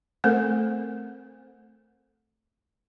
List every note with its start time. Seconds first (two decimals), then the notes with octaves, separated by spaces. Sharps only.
0.24 A3 C4 A4 A#4 C5